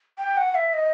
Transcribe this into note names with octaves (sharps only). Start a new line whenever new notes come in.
G5
F#5
E5
D#5